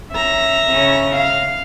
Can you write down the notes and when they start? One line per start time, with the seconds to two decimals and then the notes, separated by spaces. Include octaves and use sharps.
0.11 C#4 E5 A#5
0.68 C#3 C#4
1.16 F5